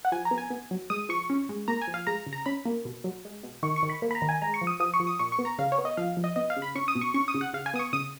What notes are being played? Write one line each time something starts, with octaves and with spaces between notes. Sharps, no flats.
F#5
F3 G#5
A#5
B3
G#5
B3
F#3
G#3 D#6
F3 C#6
C#4
G#3
A#3 A#5
G#5
F3
F5
G#3 A#5
C#3
A#5
C#4 B5
A#3
B2
F#3
G#3
B2
D#3 C#6
C#6
D#3
B5
A#3
B5
A#5
D#3
G#5
G#3 A#5
C#6
F3
D#6
F3 D#6
C#6
F3
D#6
A#2 C#6
C#6
B3
A#5
C#3 F5
C#5
B3
D#5
F3 F5
F3
D#5
B3 D#5
F5
C#3
B5
C#4 C#6
D#6
B2
C#6
C#4 C#6
D#6
C#3
F#5
C#3 F5
G#5
B3 D#6
C#6
C#3 D#6